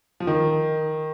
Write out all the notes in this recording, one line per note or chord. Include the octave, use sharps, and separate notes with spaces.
F3
D#3